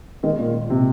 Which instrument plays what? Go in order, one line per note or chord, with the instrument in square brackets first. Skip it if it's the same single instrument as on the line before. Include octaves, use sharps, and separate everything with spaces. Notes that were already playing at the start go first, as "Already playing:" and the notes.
[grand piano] D#3 G#3
A#2
A#2
C3